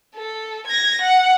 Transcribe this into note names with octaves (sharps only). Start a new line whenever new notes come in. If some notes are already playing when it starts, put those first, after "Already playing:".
A4
G#6 A#6
F#5